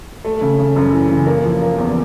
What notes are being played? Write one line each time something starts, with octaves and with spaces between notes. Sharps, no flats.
A3
C#3
C#3
F#2
E3
C#3
A#3
F3
A#3
E2